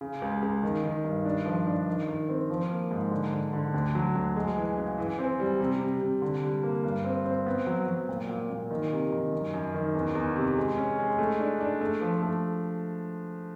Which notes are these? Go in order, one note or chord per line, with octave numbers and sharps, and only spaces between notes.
C#3
C#2
C#2
D#3
D#3
G2
D4
F3
D4
D#3
D#3
C4
F3
A#3
G#2
D3
D3
D3
D2
F#3
D2
G#3
E3
C#3
E3
C4
G3
C3
C3
C3
D3
G3
A#3
G2
C4
C4
B3
F#3
F#3
A#2
A#2
A#2
D#3
C3
D#3
F#2
F#2
D#3
E2
E2
C3
G#3
C#4
G#3
A3
D4
D4
A3
F3
A3